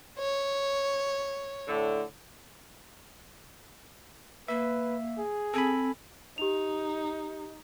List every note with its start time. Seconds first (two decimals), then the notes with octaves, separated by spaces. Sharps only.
0.19 C#5
1.68 A2 D3
4.48 A#3 B4 E5
5.18 G#4
5.54 C4 A4 G#5 B5
6.38 D#4 G4 F7